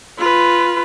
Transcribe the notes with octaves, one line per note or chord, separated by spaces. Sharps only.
F4 B4